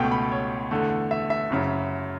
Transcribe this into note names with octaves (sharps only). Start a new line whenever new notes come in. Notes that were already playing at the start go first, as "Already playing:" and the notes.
Already playing: C#2 B2 A3 G5
B5
C#5
E2 D3 A3
E5
E5
F#1 F#2 C#3